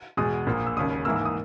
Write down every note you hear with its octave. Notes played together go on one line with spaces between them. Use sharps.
E2 B2 G#3 D#6
A#1 A#2 A#3
E6
E1 D#2 C#3 D#6
G#2 E3 A#3 E6
E6
D#6